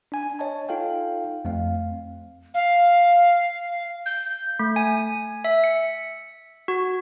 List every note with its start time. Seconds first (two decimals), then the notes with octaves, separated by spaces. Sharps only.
0.12 D4 G#5
0.39 C#5 D#5 G#5 A5
0.69 D#4 F4 A4 F5 G5
1.45 F2 A3 C4 F5
2.54 F5
4.06 G6
4.59 A3
4.76 G#5
5.45 E5
5.64 C#7
6.68 F#4